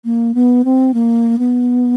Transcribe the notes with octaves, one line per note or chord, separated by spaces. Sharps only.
A#3
B3
C4
A#3
B3